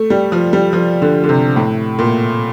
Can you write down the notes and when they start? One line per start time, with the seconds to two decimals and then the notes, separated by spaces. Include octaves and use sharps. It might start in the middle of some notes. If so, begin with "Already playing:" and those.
Already playing: A3
0.10 G3
0.32 F3
0.53 G3
0.73 F3
1.02 D3
1.24 D3
1.29 C3
1.56 A2
1.99 A#2